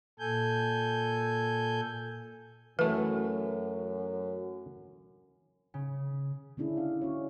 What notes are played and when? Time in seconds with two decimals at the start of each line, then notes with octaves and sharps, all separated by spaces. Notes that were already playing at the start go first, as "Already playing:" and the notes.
0.19 A#2 A4 G#5 G6
2.79 F#2 E3 A3 B4
5.74 C#3
6.57 D3 C#4 D4 E4 G#4
6.77 F5
7.01 C#4 F#4 C#5